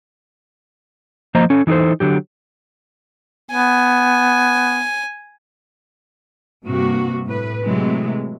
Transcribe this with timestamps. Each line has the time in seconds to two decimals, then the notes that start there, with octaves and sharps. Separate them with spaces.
1.35 F3 A#3 C5 D#5 A#5
1.50 C#4 A4
1.67 E3 D#4 E4 A4 C5
2.00 D3 F#3 G4
3.51 B3 G#5
6.65 G2 C3 A#3 F#4
7.28 A2 B4
7.64 C3 E3 F#3 G#3 A3